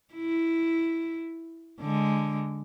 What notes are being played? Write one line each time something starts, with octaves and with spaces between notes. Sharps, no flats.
E4
D3 G#3